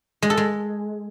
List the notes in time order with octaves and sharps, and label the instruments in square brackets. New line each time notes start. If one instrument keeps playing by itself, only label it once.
[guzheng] G#3
A4
G#3